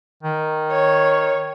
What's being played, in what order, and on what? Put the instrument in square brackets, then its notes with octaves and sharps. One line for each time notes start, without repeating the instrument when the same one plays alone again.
[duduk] D#3
[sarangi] C#5